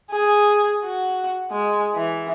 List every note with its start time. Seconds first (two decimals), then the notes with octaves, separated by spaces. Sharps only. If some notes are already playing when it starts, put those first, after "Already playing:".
0.11 G#4
0.85 F#4
1.51 G#3
1.94 E3